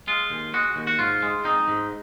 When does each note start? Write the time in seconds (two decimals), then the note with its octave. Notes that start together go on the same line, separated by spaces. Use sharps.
0.07 G#3 F4
0.30 D#2
0.54 G#3 F#4
0.76 D#2
0.87 F#4
0.99 G#2 F4
1.22 G#3
1.44 C4 D#4
1.68 G#2